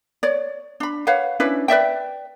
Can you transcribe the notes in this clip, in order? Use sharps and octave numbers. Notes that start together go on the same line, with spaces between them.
C#5 D5
D4 B5
B4 C#5 F5 F#5
C#4 D4 E4 B4
B4 D5 E5 G5